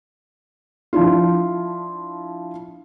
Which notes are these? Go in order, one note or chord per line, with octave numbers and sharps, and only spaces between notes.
F3 D4 E4 F4